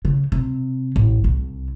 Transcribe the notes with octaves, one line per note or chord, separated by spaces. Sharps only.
C#3
C3
A1
C2